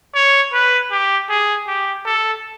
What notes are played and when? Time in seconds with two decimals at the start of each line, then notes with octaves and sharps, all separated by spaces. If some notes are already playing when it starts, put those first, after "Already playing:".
0.15 C#5
0.53 B4
0.91 G4
1.29 G#4
1.67 G4
2.06 A4